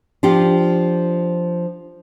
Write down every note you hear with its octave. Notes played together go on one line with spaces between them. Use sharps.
F3 D4 F4 G4